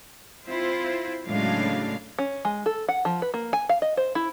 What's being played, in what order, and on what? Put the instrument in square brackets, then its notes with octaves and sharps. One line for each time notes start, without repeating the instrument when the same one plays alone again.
[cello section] C4 E4 F4 C5
A2 C#3 F#3 G#3 D4 F5
[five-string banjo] C#4
G#3
A4
F#5
F3
B4
A#3
G#5
F5
D#5
C5
E4